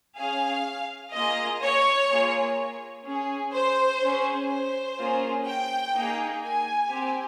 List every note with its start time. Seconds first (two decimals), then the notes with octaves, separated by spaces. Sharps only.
0.18 C#4 G#4 F5
1.13 A#3 F4 G#4 D#5
1.62 C#5
2.10 A#3 F4 G#4
3.06 C#4 G#4
3.54 C5
4.03 C#4 G#4
4.50 C5
4.99 A#3 C#4 F4 G#4
5.46 G5
5.95 A#3 D#4 G#4
6.42 G#5
6.90 C4 G4